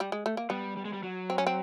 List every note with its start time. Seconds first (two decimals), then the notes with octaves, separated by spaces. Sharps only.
0.00 G3
0.12 G#3
0.26 A3
0.37 A#3
0.50 G3 B3
0.77 G3
0.85 G#3
0.93 G3
1.03 F#3
1.30 C4
1.38 C#4
1.47 C4